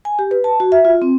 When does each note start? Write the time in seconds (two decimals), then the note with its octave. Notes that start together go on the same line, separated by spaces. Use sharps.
0.05 G#5
0.19 G4
0.31 B4
0.44 A5
0.60 F#4
0.72 E5
0.85 F4
1.02 C4